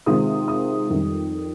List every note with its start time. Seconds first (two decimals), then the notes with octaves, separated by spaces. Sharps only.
0.06 C3 D#3 G#3 C4 F4 D#6
0.48 D#6
0.90 F2 D#3 G3